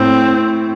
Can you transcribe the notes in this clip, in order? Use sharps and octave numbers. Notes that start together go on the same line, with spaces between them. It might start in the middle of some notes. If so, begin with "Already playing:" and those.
Already playing: A2 C4